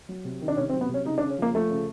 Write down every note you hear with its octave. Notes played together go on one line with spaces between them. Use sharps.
F#3
C3
D#3
D4
C3 C#4
C4
F#3
B3
C3
C#4
C#3 D#4
D4
C#3
C#4
F3 A#3
F3 A3
C#3